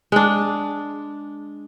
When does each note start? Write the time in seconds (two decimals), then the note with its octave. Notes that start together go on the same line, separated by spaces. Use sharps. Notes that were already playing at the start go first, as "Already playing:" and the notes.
0.12 G#3 D4